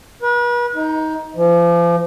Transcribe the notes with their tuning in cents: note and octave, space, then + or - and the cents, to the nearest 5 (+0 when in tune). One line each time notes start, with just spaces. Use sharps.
B4 -40
D#4 +15
F3 -35